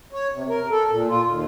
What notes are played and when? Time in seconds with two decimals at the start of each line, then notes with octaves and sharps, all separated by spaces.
0.12 C#5
0.32 C3
0.49 A#4
0.70 A4
0.90 A#2
1.09 F4
1.25 D#2